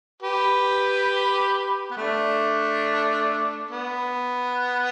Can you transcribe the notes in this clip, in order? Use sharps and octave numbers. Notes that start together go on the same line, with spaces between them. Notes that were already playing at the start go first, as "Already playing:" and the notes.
G4 B4
B3
A3 D4
B3